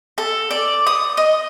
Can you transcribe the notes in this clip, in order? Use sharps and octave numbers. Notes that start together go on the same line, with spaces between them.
A4
D5
D#6
D#5